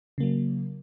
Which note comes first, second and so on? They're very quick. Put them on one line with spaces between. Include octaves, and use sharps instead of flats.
C#3 A#3 F#3